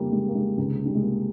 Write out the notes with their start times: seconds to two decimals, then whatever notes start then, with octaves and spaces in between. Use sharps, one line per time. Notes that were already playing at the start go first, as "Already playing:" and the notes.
Already playing: F2 C#3 F3 G3 A#3
0.12 G#3
0.28 A#3
0.35 G#3
0.57 C#2 C3 D#3
0.85 G3
0.95 G#3
1.02 A#3